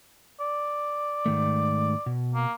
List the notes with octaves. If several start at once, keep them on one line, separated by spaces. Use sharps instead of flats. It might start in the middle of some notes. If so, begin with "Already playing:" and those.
D5
G#2 D#3 A3
B2
A#3